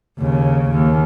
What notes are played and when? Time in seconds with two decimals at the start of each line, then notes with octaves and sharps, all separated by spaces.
0.18 D#2 C#3
0.70 D#2